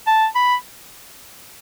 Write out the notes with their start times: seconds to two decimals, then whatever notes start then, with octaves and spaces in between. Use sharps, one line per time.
0.07 A5
0.35 B5